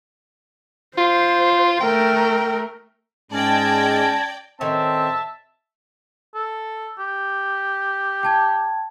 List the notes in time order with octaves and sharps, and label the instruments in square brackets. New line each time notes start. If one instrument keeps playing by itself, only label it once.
[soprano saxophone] F4 [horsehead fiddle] C5
[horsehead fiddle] A3 A#4 [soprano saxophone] G5
[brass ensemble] G#2 G#3 [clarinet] C#4 [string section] D5 G5 [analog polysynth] A5 G#6 A#6
[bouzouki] A2 D#3 C#4 [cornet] C4 [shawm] E5 [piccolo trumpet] A5
[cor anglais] A4
G4
[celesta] G5 A5 G#6